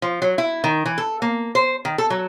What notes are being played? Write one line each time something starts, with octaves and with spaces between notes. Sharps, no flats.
F3
F#3
E4
D#3
E3
A4
A#3
C5
D#3
A4
F#3